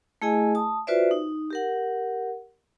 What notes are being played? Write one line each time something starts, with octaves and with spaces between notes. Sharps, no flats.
A3 E4 G#4 D#5 G#5
A5 D#6
F4 F#4 B4 C5 D5 E5
D#4
G4 A#4 F#5